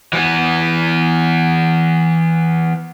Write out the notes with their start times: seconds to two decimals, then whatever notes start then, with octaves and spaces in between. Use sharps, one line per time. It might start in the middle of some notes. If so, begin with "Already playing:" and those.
0.13 E3 B3